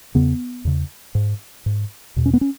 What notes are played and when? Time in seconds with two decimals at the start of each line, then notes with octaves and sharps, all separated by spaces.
0.15 E2 C#3 B3
0.65 E2 C#3
1.15 G#2
1.66 G#2
2.16 E2 B2
2.26 C#4
2.33 B3
2.41 C#4